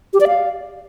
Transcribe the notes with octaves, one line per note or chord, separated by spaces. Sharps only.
G4
D5
F5